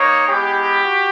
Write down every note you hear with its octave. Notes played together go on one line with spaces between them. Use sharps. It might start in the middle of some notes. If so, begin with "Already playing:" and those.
Already playing: A#3 D#4 C#5
G#3 B3 E4 G4
F#4